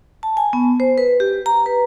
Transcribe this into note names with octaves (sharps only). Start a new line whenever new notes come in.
A5
G#5
B3
C5
B4
G4
A#5
B4